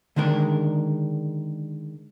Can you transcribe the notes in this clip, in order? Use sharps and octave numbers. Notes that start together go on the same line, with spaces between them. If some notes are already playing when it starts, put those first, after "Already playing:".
D3 D#3 G#3 D4 A#4